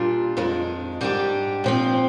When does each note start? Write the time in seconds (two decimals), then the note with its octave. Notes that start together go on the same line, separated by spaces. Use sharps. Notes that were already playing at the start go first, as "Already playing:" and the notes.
Already playing: A#2 G3 D4 F4
0.37 F2 D#3 G#3 D4
1.01 G#2 G3 D4 G4
1.64 A#2 F3 C4